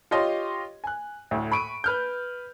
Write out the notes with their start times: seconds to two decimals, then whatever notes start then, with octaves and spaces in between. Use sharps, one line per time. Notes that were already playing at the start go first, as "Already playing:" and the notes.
0.11 F4 G4 C#5 D#5 C6
0.84 G#5 F#6
1.31 D2 A2
1.51 B5 C#6 D7 D#7
1.84 B4 F6 G6